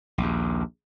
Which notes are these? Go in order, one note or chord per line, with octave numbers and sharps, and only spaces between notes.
A#1 D#2